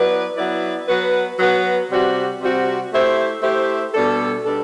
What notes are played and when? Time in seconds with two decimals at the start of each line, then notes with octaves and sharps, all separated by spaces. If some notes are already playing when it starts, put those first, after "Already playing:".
Already playing: F#3 B3 E4 B4 D5
0.37 F#3 B3 E4 B4 D5
0.88 F#3 B3 F#4 B4
1.39 F#3 B3 F#4 B4
1.90 C3 G3 C4 F#4
2.41 C3 G3 C4 F#4
2.92 A3 E4 G4 C5
3.43 A3 E4 G4 C5
3.94 B2 G3 D4 A4
4.45 B2 G3 D4 A4